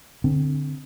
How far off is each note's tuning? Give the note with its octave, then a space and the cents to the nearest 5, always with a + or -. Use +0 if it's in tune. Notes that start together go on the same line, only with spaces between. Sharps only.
D3 +0 C4 +0